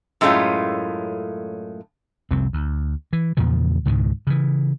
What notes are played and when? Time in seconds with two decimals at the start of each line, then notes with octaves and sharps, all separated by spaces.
0.21 F#2 A2 G#3 A3 C#4 F4
2.31 F1 C2 C4
2.53 D2
3.13 E3
3.37 E2 A#2 C#3 F3
3.85 C#2 G#2 B2 D#3
4.27 C#3 E3